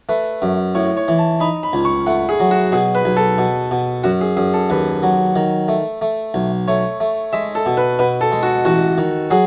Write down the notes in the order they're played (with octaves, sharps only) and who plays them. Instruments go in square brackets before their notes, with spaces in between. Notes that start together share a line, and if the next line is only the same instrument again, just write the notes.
[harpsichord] A3 [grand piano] B4
[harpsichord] F#2
[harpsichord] A2 [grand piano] C#5
[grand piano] C#5
[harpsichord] E3
[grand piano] A5
[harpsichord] D#4 [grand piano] B5
[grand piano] B5
[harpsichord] C#2
[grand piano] C#6
[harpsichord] A3 [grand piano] F#5
[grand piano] G#4
[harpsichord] F#3
[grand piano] F#4
[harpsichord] B2 [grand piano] G#4
[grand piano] B4
[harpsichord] B1
[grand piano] A4
[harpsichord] B2
B2
[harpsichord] F#2 [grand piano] F#4
[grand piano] G#4
[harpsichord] F#2 [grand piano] G#4
[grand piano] A4
[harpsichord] D#2 [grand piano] B4
[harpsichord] F#3
D#3
A3
A3
B1
[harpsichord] A3 [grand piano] C#5
[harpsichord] A3
[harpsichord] G#3 [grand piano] E5
[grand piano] A4
[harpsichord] B2
[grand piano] B4
[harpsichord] B2 [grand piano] B4
[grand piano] A4
[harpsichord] G#3
[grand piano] F#4
[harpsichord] A1 [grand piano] F#4
[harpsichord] D#3
[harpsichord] F#3 [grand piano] G#4